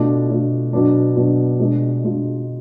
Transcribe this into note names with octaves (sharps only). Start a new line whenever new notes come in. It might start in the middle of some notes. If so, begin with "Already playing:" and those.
Already playing: B2 A3 D4 F4
B2 A3 D4 F4
B2 F#3 B3 D4
B2 F#3 B3 D4
B2 G#3 D4 F4
B2 G#3 D4 F4